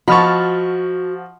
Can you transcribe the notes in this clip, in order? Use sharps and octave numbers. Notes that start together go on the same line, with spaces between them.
F3 F#4 D#5 A5 B5 C#6 F6 A6